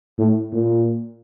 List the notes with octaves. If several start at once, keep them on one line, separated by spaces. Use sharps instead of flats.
A2
A#2